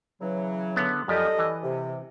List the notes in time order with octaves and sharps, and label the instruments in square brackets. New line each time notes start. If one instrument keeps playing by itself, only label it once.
[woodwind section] C#3 E3 F#3
[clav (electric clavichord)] D3 B3
[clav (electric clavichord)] F#2 F3 G4 [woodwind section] G3 A4 D#5
[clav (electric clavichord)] E3
[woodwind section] C3